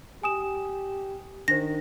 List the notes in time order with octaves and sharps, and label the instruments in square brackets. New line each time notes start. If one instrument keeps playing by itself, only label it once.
[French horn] G4 [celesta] G#5 D#6 E7
[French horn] D#3 [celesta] D4 C5 [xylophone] A#6